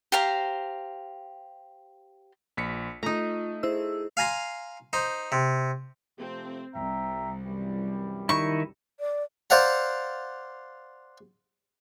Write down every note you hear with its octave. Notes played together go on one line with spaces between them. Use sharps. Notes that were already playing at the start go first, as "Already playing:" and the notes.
G4 C5 F5 A#5
A#1 B6 C#7
A3 D#4 F4 A#5
E4 G#4 C5 E6
F5 G#5 A#5 C6
D#4 C5
C3
C3 F3 A3 C4
C2 E5 G5 A#5
F#2 E3 G3
D#3 D#4 E4 C#6
D5
C5 D5 F5 F#5 A#5